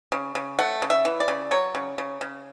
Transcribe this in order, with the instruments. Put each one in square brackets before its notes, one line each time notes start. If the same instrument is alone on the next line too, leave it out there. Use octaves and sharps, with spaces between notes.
[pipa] C#3
C#3
A3 F#5
C#3
E5
E3
D5
C#3
F#3 C#5
C#3
C#3
C#3